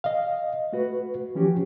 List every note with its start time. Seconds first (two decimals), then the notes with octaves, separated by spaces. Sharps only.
0.04 D#5 F5
0.73 A3 F#4 B4
1.35 E3 F3 C#4 F#4 G4